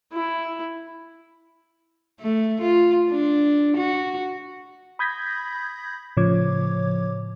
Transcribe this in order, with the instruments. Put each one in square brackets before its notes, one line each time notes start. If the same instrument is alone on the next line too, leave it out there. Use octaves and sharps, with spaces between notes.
[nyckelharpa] E4
[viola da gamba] A3
F4
D4
F#4
[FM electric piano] B5 D#6 G6 G#6 A#6 B6
A2 C#3 F3 C#5 D6 G#6